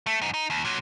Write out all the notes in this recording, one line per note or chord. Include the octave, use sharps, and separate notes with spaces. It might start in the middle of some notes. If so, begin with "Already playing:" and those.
A3
F#2 D#4
D#4
D#2
A#2 F#3